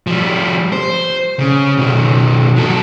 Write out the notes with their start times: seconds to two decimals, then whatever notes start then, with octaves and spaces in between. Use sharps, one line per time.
0.07 F3 G3
0.73 C5
1.39 C#3
1.78 B2 D#3
2.56 F#3 A4